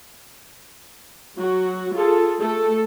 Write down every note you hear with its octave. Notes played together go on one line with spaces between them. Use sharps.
F#3 F#4
F4 G#4 A4
A3 A4